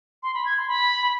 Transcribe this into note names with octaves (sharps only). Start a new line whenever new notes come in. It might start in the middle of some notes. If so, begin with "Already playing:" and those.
C6
B5
G#6
C6
B5